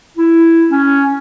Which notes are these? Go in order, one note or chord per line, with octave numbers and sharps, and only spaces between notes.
E4
C#4